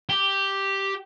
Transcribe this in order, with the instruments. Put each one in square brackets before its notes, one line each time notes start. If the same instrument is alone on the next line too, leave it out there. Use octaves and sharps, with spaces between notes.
[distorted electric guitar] G4